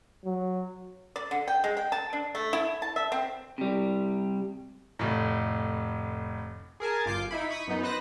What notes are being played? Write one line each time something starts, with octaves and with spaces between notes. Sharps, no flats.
F#3
D5
D3
G5
G#3
G5
A5
D4
A3
E4
A5
E5
C4
C3 G3
F1 A2
G#4 A#4 G#5 A5
G1 F4 D6 G6 C7
D#4 E4 B5
B5 C#6 D#6 B6
F#2 B3 D#4
B4 C5 F#6 A#6